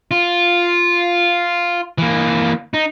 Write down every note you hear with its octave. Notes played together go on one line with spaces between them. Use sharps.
F4
E3 A#3
D#4